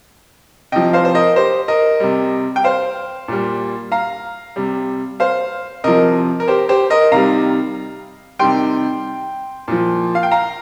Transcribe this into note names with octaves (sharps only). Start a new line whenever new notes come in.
C3 F3 D#5 G5
C5 F5
C5
A#4 D#5
G4 C5
A#4 D#5
C3 G3
G5
C5 F5
A#2 G3
F5 A#5
C3 G3
C5 F5
C3 F3 A#4 D#5
A#4
G4 C5
G4 C5
A#4 D#5
C3 D#3 G3 F5 A#5
C3 D#3 G3 G5 C6
A#2 F3
F5
G5
F5 A#5